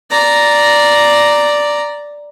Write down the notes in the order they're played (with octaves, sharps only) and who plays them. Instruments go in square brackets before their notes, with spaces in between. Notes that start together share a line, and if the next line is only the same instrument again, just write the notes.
[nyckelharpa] D5 A#5